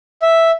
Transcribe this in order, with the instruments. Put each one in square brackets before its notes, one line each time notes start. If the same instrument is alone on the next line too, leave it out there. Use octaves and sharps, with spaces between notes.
[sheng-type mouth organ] E5